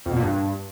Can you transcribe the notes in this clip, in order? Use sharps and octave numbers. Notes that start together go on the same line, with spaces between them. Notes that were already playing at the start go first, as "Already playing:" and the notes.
F2
B2
A#2
G2